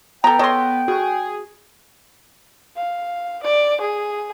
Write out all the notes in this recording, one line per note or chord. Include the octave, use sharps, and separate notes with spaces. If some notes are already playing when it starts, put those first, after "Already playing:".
B3 A4 G5 A#5
A4 C#5 D#5 C6
F#4 G#4
F5
D5
G#4